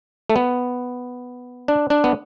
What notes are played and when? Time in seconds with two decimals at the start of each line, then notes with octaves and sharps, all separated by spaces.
0.30 A3
0.36 B3
1.68 D4
1.90 D4
2.04 B3